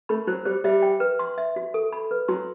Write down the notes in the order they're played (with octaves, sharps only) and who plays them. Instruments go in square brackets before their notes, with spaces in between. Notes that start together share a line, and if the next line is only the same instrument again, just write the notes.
[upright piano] A3 [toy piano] B5
[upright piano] F#3 [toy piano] C5
[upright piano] G3 [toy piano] C5
[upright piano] G3 [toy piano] E5
[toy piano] G5
B4
C6
E5
F#4
A4
B5
B4
[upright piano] F#3 [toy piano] C6